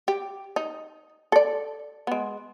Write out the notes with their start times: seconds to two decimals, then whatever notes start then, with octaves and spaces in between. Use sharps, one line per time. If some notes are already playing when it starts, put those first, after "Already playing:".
0.08 G4
0.56 D#4
1.32 A4 D5
2.07 G#3 B3